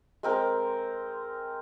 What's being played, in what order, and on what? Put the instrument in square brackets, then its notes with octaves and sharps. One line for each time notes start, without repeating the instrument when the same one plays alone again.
[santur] G#3 C4 A#4